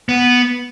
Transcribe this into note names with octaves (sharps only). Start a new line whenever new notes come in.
B3